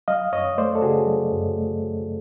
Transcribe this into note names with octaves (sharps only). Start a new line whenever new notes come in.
F#3 D#5 F5
F#2 C#5 D#5
A3 C5 D5
A4
C#3 F#4 G#4
F#3
F#2
A3